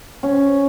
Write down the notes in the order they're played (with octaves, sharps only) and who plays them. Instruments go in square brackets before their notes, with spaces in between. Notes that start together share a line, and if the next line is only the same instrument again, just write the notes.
[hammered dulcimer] C#4